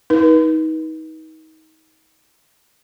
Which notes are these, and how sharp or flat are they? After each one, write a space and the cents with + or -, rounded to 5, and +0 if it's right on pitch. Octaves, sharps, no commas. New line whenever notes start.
D#4 +30 B4 -35